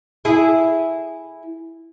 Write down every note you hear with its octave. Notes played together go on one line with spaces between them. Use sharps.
E4 G#4